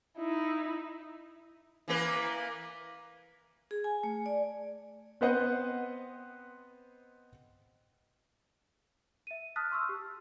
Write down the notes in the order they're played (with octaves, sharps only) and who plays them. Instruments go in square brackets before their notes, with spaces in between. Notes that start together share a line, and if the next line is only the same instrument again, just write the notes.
[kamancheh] D#4 E4
[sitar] E3 A#3 B4
[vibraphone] G#4
G#5
A3
D5
[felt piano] B3 C4 B4 C5 D#5 F#5
[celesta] E5 D#7
A5 D#6 F6 F#6 A6 B6
C6 C#6 E6 F6
G4